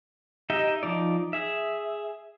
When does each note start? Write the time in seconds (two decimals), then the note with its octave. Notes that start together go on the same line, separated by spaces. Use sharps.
0.50 D#4 G4 D#5 E5 G5
0.83 F3 D#4 D5
1.33 G#4 E5